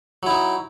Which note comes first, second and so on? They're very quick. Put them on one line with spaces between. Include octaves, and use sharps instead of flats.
F#3 E4 D#4